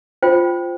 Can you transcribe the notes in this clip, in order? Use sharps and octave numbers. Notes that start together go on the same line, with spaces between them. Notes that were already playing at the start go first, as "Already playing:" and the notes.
F4 C5 G5